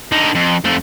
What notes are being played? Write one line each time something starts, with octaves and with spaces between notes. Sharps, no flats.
D3 D#4
F2
F2 A3